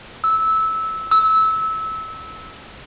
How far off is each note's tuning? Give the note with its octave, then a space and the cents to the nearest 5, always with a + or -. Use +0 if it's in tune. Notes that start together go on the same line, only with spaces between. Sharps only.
E6 -15
E6 -20